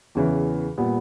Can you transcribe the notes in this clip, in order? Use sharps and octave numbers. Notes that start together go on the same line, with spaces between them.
E2 C#3 E3
A#2 G3 B3